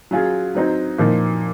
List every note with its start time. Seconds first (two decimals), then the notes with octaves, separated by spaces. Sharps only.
0.11 F#3 C#4 F4 G#4
0.55 F#3 C4 D#4
0.98 A#2 F3 A#3 D#4